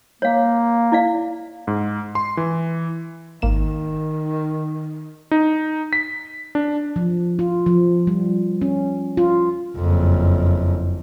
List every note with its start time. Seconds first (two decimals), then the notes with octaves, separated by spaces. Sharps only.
0.22 A#3 C#5 F5
0.92 E4 D5 F5
1.67 G#2
2.15 C6
2.37 E3
3.42 G#1 D#3 A#3 E7
5.31 D#4
5.93 B6
6.55 D4
6.96 F3
7.39 F4
7.66 F3
8.07 G3
8.62 C#4
9.17 F4
9.76 F#1 F2